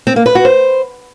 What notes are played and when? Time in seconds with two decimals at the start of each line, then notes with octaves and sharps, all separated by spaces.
0.07 C4
0.16 A#3
0.26 B4
0.35 F#4
0.45 C5